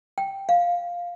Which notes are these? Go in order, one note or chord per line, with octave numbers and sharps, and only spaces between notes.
G5
F5